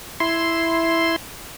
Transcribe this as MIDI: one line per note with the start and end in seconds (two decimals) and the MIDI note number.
0.20 1.16 64
0.20 1.16 84